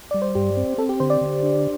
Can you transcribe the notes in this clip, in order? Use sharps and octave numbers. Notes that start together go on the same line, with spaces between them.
G3 D5
C5
G2 G4
C4
C4 A4
G4
D3 C5
D5
D3
D4